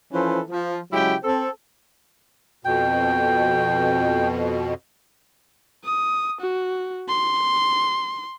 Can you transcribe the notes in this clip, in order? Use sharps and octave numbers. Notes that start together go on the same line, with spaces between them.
E3 F3 C#4 A4 B4 C5
F3
C#3 F#3 G#3 E4 G4 G5
C4 A4
F2 B2 G5
D#6
F#4
C6